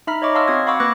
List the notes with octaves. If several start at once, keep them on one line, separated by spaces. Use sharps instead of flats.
D#4 E5 A#5 B5 F6 B6
C#5 D#5 E5 C#6 D6
D#5 F5 A5 C6 E6 F6
C4 F#4 D#6 G#6
F5 F#5 B5 C#6 D6 E6
A#3 B4 D6 F#6 G#6 A#6